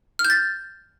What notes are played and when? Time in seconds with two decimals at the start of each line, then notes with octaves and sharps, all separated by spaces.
0.19 F6
0.25 G6
0.30 A6